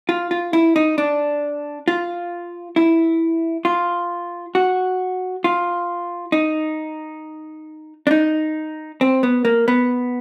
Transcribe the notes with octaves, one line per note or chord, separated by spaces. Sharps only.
F4
F4
E4
D#4
D4
F4
E4
F4
F#4
F4
D#4
D4
D#4
C4
B3
A#3
B3